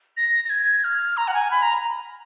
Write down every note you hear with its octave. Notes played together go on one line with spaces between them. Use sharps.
A#6
A#6
G#6
F6
A#5
F#5
G#5
B5
A#5